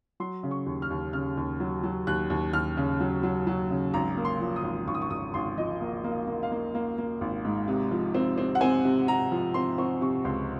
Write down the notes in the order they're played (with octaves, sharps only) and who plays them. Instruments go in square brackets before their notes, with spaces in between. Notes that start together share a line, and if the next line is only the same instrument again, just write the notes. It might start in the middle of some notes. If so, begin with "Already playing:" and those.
[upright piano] F#3 C6
C#3
C#6
D#2
F6
D#2
C#3 F6
D#2
F#3
F#3
D#2 F#6
D#2
D#2 F6
C#3
F#3
F#3
F#3
C#3
G#1 A#5
A#3
C6
F3
D#6
G#1
G#1 C#6
D#6
C#6
G#1 D#6
G#1 C6
F3 D#5
A#3
A#3
F5
A#3
F5
A#3
A#3
A#3
G#1
G#2
C3
F3
C4
C4
F#5
C4 G#5
C3
C3 A#5
F3
C4 C6
C4 C#6
C3 C#6
C#2 C6